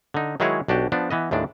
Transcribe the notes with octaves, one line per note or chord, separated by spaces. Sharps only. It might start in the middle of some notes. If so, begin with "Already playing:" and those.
D3 D#4
D#3 F#3 G#3 E4 G#4 C#5
B1 D4 F#4 G4
F3 B3 D4
E3 B3 D#5
D#2 A2 G#3 D4